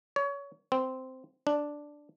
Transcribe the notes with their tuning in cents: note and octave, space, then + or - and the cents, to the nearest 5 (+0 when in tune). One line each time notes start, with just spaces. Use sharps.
C#5 +25
C4 -10
D4 +0